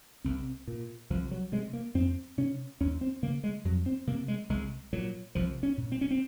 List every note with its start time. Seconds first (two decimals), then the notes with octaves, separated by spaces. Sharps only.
0.24 C2 C4
0.67 A#2
1.10 C2 F3
1.31 F#3
1.52 C3 G#3
1.73 A#3
1.94 F2 C4
2.38 C3 C#4
2.80 D#2 C#4
3.01 C4
3.22 C#3 A#3
3.44 G#3
3.65 F2 F#3
3.86 C4
4.07 C3 A#3
4.28 G#3
4.49 C2 G#3
4.93 A#2 F#3
5.35 C2 F3
5.63 C#4
5.77 A#2
5.92 C4
6.01 C#4
6.11 C4